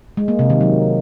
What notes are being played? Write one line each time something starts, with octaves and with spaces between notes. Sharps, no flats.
G#3
A#3
C3
D#3
F#3